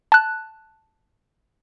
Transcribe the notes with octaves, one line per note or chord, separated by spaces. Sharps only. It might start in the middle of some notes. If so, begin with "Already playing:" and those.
A5 F#6